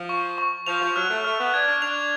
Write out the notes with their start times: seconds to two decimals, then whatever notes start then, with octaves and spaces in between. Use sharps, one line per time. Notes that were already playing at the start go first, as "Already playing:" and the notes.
Already playing: F3
0.09 C#6
0.38 C#6
0.66 F3 F7
0.81 F3
0.96 F#3 F6
1.10 A3
1.24 A3 F6
1.39 B3
1.54 D4 G#6
1.67 D4
1.81 D4 F7